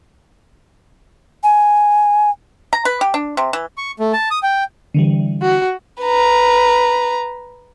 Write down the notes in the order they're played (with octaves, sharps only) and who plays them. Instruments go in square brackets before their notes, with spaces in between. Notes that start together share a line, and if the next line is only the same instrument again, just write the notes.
[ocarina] G#5
[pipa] A#5
B4
G4
D4
C3
E3
[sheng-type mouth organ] C#6
A3
A5
D#6
G5
[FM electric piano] D3 E3 G3
[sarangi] F#4
[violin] B4 A#5